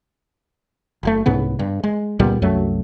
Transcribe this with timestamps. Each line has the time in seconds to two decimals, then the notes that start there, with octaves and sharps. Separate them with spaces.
1.03 F#1 A2 A3
1.26 C2 G#2 C#3 B3
1.59 G2
1.84 G#3
2.19 C#2 A#2 G3 B3
2.42 C2 F#2 F#3 A3